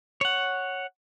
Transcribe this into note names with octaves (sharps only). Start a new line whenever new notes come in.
C#5 F#5